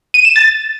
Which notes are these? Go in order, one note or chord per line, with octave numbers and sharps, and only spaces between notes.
D#7
E7
A6